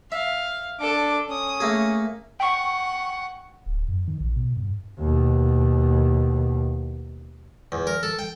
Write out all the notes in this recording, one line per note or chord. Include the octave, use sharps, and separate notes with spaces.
E5 F5
D4 A4 D6
C#4 D#6
A3 A#3 G#4
F#5 G5 C#6
D1
F#2
D#3
A#1
B2
G2
D#2 B2
E2
A#4
A4
G5